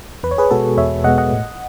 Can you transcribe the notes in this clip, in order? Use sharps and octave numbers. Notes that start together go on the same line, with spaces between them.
E2 B4
C#5
G#4 B4
B2 G#3 B3 F#4 A4
E2 C#5 E5
B2 G#3 B3 D#5 F#5
D#5 F#5
A2